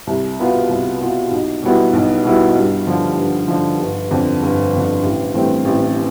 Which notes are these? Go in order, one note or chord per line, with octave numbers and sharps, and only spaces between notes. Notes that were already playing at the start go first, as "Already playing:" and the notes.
C2
B2 B3 F4
C2
B2 B3 F4
B1
B2 G3 B3 E4
B1
B2 G3 B3 E4
G2
D3 F3
G2
D3 F3
G1
F2 D3
G1
F2 D3
A1
G2 E3 A3 C4
A1